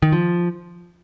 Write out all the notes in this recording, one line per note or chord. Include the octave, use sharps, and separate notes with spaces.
D#3
F3